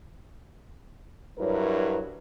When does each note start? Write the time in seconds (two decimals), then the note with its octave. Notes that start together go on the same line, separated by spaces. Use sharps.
1.38 G2 F#3 E4 A#4 B4 C#5